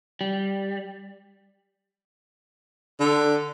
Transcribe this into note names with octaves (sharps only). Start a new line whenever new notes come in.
G3
D3 D4